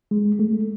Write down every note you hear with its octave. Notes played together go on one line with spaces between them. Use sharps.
G#3
A3